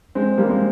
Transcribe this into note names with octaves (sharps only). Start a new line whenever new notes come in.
G#3 C4
G3 A#3
G#3 C4